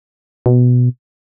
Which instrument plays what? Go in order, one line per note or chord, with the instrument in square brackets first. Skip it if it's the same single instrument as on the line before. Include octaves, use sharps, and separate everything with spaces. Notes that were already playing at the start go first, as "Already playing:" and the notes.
[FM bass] B2